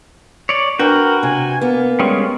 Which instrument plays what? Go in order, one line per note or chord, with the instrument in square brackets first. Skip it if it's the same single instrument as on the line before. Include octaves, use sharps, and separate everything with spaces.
[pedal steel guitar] C#5 D5
[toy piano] D4 [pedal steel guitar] F#4 G5 [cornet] A#4 [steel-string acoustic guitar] B4
[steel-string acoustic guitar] C3 [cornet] G#5
[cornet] A#3 [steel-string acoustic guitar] B3
[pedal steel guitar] G3 G#3 C#4 [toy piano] G5